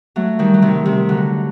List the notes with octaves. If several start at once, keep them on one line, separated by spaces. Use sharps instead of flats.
F#3 A3
D#3 G3
F#3
C3 D#3
C3 D#3
D3 F#3